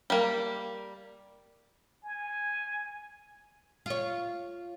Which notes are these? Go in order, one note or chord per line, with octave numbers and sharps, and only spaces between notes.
G3 A#3
G#5
F4 C#5